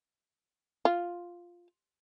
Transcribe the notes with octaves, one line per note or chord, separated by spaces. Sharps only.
F4